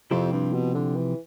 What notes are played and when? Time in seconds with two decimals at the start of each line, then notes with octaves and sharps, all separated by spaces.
0.10 F2 C3 F3 C4 E4 G4
0.32 G2
0.53 B2
0.75 D3
0.96 E3